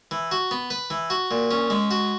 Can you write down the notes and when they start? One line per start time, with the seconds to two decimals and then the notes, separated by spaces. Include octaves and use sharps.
0.11 E3
0.31 F#4
0.51 B3
0.70 B4
0.90 E3
1.10 F#4
1.31 A#2
1.51 C#4
1.70 G#3
1.91 F#4